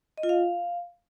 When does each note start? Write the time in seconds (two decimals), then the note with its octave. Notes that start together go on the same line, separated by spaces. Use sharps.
0.18 D#5
0.23 F4
0.29 F5